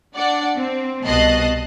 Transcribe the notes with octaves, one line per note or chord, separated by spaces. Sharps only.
D4 D5 F#5
C4
C2 B2 D#5 A5 F#6 C7